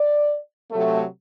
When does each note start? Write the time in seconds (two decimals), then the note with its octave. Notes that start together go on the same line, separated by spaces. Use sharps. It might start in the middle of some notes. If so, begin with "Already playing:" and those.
Already playing: D5
0.72 C3 F#3 A3